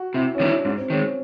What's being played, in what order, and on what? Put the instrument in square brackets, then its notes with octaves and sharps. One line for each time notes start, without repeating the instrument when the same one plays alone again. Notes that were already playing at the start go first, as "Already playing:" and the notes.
Already playing: [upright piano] F#4
[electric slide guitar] C3 [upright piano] E4
[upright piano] C#4
[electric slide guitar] D#3 G3 B3 E4 [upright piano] D4
[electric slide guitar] G#2 [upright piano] D4
[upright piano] C4
[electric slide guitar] D#3 G#3 [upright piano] C#4